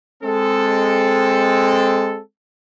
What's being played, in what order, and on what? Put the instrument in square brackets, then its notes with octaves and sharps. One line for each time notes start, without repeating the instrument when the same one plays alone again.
[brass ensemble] G#3 C4 A4